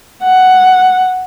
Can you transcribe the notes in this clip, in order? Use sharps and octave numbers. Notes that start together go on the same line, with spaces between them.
F#5